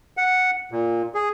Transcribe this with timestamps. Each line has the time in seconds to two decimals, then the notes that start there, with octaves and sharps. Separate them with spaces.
0.17 F#5
0.72 A#2
1.14 G#4